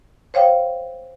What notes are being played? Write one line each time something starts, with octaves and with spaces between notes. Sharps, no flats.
C5 C#5 F5 G5